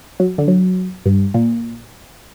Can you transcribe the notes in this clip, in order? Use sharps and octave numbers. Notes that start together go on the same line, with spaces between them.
F#3
D3
F#3
G2
A#2